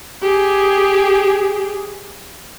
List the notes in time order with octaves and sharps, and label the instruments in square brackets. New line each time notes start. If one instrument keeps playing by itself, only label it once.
[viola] G4 G#4